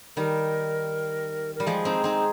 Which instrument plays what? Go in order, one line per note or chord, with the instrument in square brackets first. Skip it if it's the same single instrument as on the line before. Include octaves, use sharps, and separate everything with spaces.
[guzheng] D#3 G3 [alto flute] A#4
[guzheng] G3 [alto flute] A#4
[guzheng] F3 G#3 [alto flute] G#4
[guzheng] C4 D#4
C4 D#4